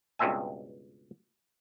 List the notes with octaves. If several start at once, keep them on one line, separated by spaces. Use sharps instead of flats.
C#2 G2 B2 C4 E5 G#5